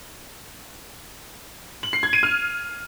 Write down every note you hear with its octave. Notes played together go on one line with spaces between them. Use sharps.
F#7
C7
G#6
D#7
F6